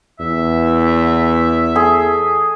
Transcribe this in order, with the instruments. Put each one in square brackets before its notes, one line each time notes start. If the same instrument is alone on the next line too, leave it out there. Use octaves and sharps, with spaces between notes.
[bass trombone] E2 [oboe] E5
[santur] A3 G#4 C6